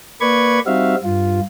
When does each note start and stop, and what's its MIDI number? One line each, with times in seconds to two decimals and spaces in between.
0.21 0.60 58
0.21 0.60 71
0.21 0.60 74
0.21 0.60 83
0.21 0.60 85
0.21 0.60 92
0.66 0.95 55
0.66 0.95 60
0.66 0.95 63
0.66 0.95 66
0.66 0.95 76
0.66 0.95 77
1.04 1.40 43
1.04 1.40 65